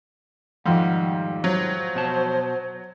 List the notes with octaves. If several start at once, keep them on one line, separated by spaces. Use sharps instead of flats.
F2 G#2 D#3 G3 F#5
F#3 C5
B2 F#4 A5